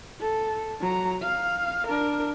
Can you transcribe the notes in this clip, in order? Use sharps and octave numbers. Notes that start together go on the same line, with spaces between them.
A4
F#3 A#5
F5
D4 A#4